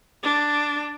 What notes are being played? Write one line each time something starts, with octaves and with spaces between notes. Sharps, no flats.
D4